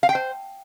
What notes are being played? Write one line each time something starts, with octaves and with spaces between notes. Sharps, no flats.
F5
G5
C5